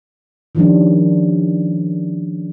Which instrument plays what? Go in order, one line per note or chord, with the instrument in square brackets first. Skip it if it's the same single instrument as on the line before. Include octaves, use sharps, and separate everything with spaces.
[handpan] D#3 F3 G3 C#4 D4